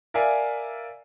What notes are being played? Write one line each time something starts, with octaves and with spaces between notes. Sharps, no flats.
A#4 D5 E5 F5 G#5